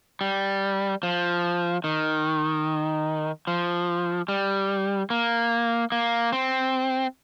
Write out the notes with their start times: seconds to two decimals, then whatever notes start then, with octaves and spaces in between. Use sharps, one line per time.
0.21 G3
1.03 F3
1.84 D#3
3.47 F3
4.28 G3
5.10 A#3
5.92 A#3
6.33 C4